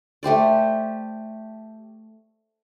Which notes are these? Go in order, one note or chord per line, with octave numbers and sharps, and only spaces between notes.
A3 G4 C5 D5